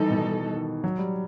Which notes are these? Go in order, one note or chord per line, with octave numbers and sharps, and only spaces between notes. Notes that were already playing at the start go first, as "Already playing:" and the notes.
Already playing: D#3 E3 G3 D#4 A4
B2
D#3
F#3
G3